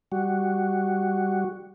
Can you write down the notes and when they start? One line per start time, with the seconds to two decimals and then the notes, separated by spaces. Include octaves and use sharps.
0.12 G3 F#4